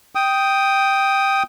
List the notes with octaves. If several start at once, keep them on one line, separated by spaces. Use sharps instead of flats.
G5 D#6